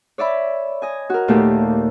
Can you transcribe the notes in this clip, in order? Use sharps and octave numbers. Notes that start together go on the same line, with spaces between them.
C#5 D5 E5 B5
D#5 G#5
F#4 A#4
D#2 A#2 A3 G4